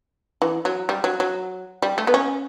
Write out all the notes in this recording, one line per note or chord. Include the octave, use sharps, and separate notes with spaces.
E3
F#3
G3
F#3
F#3
G3
A3
B3
C#4